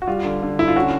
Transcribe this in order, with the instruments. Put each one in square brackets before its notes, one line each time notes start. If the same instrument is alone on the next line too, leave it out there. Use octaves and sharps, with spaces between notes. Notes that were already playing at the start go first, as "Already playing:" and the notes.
[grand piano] F#4
[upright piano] G3 [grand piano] F4
[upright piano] D3
D3
[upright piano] D3 [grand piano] E4
[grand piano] F4
[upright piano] C#4 [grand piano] F#4